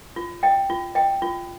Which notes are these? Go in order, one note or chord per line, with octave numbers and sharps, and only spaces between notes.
F4
D#5 G5
F4
D#5 G5
F4